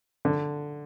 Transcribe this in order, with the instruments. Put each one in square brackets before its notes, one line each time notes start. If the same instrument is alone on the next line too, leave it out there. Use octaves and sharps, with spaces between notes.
[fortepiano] D3